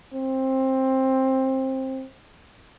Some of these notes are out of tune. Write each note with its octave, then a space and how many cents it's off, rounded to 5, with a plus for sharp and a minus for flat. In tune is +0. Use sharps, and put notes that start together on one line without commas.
C4 +15